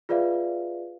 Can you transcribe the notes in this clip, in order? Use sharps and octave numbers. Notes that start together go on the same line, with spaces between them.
F4 G#4 B4 D5 E5 F5